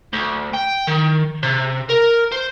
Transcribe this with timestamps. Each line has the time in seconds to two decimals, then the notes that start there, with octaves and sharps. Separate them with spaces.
0.13 D2
0.53 G5
0.87 D#3
1.43 C3
1.90 A#4
2.32 C5